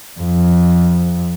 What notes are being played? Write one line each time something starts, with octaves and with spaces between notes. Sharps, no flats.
F2